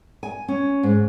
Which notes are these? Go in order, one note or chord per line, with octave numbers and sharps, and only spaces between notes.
G#5
C#4
G#2